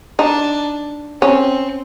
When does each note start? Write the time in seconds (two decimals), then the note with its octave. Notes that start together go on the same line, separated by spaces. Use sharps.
0.19 D4 D#4
1.22 C4 C#4